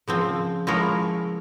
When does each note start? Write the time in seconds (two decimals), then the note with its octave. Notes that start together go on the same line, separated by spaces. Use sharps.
0.08 C#3 F3 C4
0.67 F3 G#3 E4 A#4 C#5